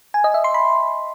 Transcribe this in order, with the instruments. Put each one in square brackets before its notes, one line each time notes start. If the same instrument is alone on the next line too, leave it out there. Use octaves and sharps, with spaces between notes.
[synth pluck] G#5
D#5
E5
C6
B5